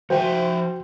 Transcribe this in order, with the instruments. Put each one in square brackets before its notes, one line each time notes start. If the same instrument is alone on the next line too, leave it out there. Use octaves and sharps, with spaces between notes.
[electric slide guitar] F3 E5 [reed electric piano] F#4 G5 [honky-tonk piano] C5